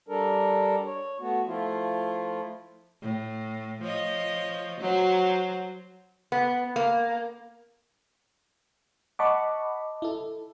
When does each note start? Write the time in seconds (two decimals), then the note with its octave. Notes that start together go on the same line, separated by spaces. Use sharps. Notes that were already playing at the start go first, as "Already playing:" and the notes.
0.08 G3 D4 A4 A#4
0.85 C#5
1.20 A3 B3 F#4
1.46 F3 A3 E4 F4
3.02 A2
3.82 F3 C#5 D#5
4.79 F#3 C5
6.32 B3
6.76 A#3
9.19 D#5 F#5 A5 B5 C#6 D6
10.02 E4 A4